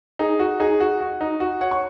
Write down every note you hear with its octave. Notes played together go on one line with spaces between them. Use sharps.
D#4 G#4
F#4
D#4 G#4
F#4
F#4
D#4
F#4
C#5 F#5
C#6